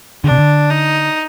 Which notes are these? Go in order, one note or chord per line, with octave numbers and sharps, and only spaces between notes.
D3 D4
C3
D3
D#4